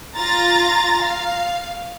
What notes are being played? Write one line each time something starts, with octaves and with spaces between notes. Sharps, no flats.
F4 A#5 A6 A#6
F5